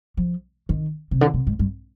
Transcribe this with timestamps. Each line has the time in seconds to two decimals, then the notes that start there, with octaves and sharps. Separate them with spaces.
0.17 F3
0.69 D#3
1.11 C3
1.21 D3
1.34 C3
1.47 G#2
1.59 G2